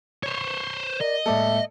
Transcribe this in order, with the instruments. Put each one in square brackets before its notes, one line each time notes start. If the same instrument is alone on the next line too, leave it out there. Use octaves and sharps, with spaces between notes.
[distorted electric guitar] C5 C#5
[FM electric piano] A#4 [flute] D5 [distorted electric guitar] D#5
[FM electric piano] A2 G#3 A#3 [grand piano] A4 D5 [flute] E5